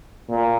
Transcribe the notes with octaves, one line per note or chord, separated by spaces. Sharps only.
A#2